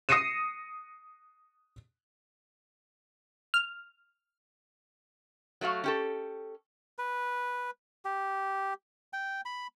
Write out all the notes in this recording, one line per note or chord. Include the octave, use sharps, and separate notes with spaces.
D#6 A#6 C7 C#7 D#7 E7
F6
F#3 A3 F#4 F5
C#4 G4 A4
B4
G4
G5
B5